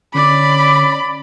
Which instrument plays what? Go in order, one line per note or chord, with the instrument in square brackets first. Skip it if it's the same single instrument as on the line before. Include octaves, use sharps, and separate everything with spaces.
[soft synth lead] D3 [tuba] C#4 [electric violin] D5 D6 [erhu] B5